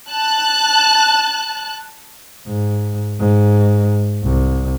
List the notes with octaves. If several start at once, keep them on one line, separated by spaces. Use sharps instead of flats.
A5 F#6
G#2
G#2
C2